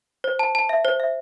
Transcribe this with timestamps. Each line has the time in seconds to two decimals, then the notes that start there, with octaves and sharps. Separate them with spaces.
0.24 C5
0.39 A5
0.55 A5
0.69 E5
0.85 C5
1.00 E5